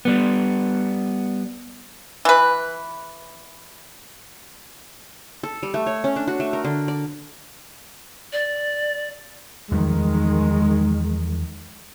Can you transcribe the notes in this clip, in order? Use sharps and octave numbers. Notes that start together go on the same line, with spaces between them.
G3 B3
E3 B4
A4
G3
A3
C#5
C#4
D4
F#4
A3
A#4
D3
D5
D5
E2 D#3 F3 G3 G#3